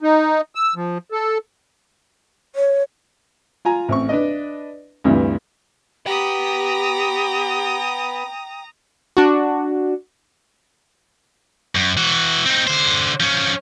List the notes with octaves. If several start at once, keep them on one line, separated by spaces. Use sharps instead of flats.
D#4
E6
F3
A4
C#5
F4 G#5 A#5
A1 C4 C#6
D4 B4 D5 D#5
D2 G2 C3 E3
B3 G4 G5 A#5 D#6
D4 F#4
F#2
E3 F#4
C4 D#4
D3 C5
F3 C#4